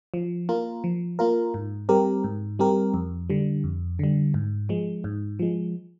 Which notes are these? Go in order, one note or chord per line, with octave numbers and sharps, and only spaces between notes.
F3
A#3 F4 A#4
F3
A#3 F4 A#4
G#2
G3 C4 G4 A#4
G#2
G3 C4 G4 A#4
F2
D3 G3
F2
D3 G3
G#2
F3 G#3
G#2
F3 G#3